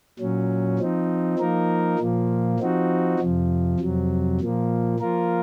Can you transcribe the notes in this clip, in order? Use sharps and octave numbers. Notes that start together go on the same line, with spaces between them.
A#2 F#3 C#4
F3 C4 D#4
F3 A#3 D#4 A#4
A#2 F3 A#3
F3 C4 D#4 F#4
F2 C3 F3
F2 C3 F#3
A#2 F3 A#3
F3 A#3 F4 A#4